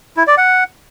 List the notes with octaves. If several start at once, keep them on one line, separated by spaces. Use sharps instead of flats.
E4
D5
F#5